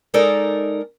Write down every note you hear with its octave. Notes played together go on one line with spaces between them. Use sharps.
G#3 D#4 A4 A#4 D5